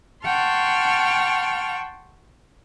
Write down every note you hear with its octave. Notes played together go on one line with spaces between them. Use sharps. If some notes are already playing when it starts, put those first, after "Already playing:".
F#5 G5 A5 C6 C#6 F6